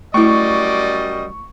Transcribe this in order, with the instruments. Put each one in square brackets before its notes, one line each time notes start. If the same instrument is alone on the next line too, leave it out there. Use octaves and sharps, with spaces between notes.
[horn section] F#2 G3 D#5 [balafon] A3 E4 [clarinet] D5 [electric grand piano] C#6